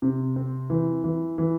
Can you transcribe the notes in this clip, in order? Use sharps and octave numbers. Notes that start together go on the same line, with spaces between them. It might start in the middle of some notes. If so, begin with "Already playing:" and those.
C3
C4
E3
E3
E3